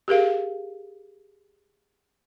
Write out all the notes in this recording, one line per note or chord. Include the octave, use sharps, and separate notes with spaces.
G4 G#4 A#4 F5